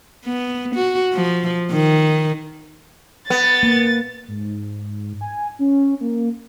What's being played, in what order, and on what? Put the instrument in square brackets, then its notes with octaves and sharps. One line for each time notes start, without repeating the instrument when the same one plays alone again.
[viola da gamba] B3
F#4
F3
D#3
[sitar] B3 [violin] A6
[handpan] A#3
[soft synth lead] G#2
G#5
C#4
A#3